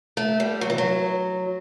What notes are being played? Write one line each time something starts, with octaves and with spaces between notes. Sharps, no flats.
A3
G3
F#3
E3
F#3